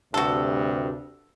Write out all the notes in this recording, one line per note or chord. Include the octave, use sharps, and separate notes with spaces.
D2 G2 C3 F#4 A4